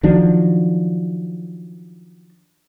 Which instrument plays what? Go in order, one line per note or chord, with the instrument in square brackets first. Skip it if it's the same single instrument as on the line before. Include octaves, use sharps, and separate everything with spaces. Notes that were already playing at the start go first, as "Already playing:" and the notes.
[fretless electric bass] D#3 F3 F#3 D4